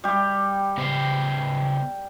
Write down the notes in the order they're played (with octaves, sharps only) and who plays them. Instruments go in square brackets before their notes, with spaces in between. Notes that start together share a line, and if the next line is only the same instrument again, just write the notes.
[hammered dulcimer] G3 G4
[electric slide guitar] C#3 B3 C5